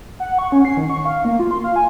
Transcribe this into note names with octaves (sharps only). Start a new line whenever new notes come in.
F#5
C#6
C#4
C7
D#3
C#6
F5
A#3
F4
C6
F5
G#5